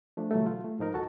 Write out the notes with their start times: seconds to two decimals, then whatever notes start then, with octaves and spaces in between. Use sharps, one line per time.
0.17 F3 A3 D4
0.31 B2 D3 E3 F#3 G3 A3
0.46 F4
0.64 A3
0.79 G#2 F3 D#4 A#4
0.94 D#2 F#4 A4 A5